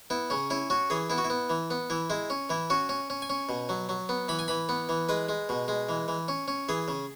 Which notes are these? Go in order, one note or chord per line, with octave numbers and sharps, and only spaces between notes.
B3 E4
C#3 C#4
C#4 E4
C#4 F#4
E3 G#4
B3 E4
F#4
E4
B3
E3
B3
E3 E4
G#3 E4
C#4
E3 E4
C#4 F#4
C#4
C#4
G#5
C#4
B2
F#3
F#3
B3
E3 B5
G#5
E3 B5
B3
E3
G#3 B4
G#3
B2
G#3
E3
E3
C#4
C#4
E3 G#4
C#3